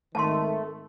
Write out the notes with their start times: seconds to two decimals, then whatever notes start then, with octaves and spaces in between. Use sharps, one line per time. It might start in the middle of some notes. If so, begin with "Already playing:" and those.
0.15 G#1 D#3 A3 A5 C6